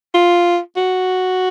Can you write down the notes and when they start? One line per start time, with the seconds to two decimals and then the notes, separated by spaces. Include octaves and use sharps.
0.15 F4
0.77 F#4